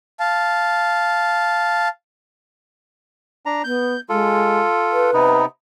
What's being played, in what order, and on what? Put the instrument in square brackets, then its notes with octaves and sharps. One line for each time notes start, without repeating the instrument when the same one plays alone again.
[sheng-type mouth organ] F5 A5
[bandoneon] D4 A#5
[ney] B3 [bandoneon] G6
[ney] G#3 [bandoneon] F4 A4
[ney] B4
[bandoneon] C3 B3 D#4